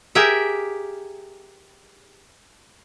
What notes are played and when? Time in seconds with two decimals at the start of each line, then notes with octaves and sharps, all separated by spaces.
0.15 G4 G#4 A#4 E5